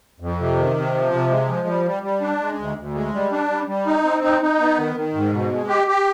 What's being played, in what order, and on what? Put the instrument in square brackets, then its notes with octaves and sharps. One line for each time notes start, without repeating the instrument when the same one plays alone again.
[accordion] F2
C3
D#3
C3
F3
C3
G#3
F3
G3
G3
G3
D4
G#3
D2
D2
G#3
G3
D4
G3
G3
D#4
C4
D#4
D#4
B3
D#3
D#3
G#2
B2
G#3
G4
G4